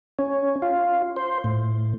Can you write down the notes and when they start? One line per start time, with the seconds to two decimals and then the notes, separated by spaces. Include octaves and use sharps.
0.19 C#4
0.62 F4
1.16 C5
1.44 A2